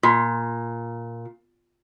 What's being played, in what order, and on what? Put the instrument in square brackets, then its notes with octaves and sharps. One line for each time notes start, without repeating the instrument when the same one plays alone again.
[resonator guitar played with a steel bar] A#2 [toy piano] F4 [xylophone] C6